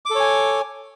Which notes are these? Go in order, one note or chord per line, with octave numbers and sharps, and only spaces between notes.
A4 C#5 G#5 D6